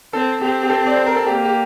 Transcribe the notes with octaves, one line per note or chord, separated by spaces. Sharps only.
C4 A4
C4 G4
G4
A4
D5
C5
A#4
A4
A#3 G4
G4